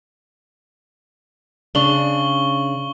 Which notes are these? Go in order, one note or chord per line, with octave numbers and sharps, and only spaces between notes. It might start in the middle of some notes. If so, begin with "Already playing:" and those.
C#3 D4 C#6 F#7 G7